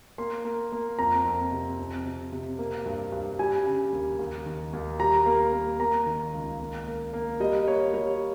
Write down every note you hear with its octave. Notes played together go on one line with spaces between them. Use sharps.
A#3 C6
A#3
A#3
F2 A#5
F2
C3
F2
C3
C3
A#3
G2
G2
G3 G#5
C#3
D#2
D#2
D#3
D#2
G3 A#5
A#3
A#3
A#3 A#5
D#3
C#2
A#3
A#3
A#3
G3 D#5
A#3 C#5
G3 C#5